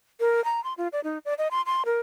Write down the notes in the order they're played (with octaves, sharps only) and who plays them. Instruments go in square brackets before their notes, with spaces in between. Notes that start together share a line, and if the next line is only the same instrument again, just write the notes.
[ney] A#4
A#5
C6
F4
D5
D#4
D5
D#5
C6
C6
A#4